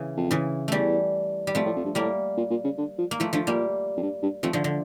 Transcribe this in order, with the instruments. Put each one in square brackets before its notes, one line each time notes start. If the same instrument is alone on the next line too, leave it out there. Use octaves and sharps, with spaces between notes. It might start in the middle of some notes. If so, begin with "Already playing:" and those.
Already playing: [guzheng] C#3 E3
[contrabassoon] F2
[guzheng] C#3 E3
[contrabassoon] E2 [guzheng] E3 G3 A3
[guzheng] G3
[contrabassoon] F2 [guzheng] F3 A3
[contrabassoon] A2
F2
G2
[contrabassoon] A2 [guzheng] G3 A#3
[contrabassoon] A#2
A#2
C#3
D3
F3
[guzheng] A#3
[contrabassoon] E3 [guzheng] F3 A3
[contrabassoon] D3 [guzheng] F3 A3
[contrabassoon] A#2 [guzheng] G3 A#3
[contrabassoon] F2
G2
G2
[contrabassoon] F2 [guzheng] F3 A3
[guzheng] D3 F3
D3